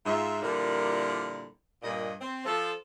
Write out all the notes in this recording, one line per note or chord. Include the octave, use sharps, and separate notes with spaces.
G#2 F4 E5
A#2 D3 F3 G3 E4 A#4
G2 A#2 D#5
C4
F3 A4